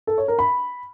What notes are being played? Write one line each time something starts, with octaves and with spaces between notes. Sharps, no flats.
A4
C#5
A#4
B5